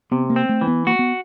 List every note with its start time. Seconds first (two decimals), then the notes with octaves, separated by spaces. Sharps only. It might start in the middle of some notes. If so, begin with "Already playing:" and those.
0.11 C3 B3
0.30 A#3
0.36 C4
0.49 A3
0.61 E3
0.67 B3
0.87 A#3 F#4
0.99 B3